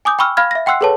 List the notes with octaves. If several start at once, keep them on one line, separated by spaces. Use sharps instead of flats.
G#5 D6 D#6 G6
G5 B5 C#6 E6 F6
F5 B5 F6 G#6
E5 A#6
F#5 G5 C6 E6 F#6 C7
G#4 A4 B4 C#5 A5